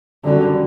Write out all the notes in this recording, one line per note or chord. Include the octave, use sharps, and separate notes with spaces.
F#2 D3 D#3 G3 D4 F#4